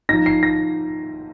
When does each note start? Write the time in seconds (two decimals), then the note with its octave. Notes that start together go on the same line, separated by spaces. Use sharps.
0.09 F3 D#4 A#6
0.26 C7
0.43 A#6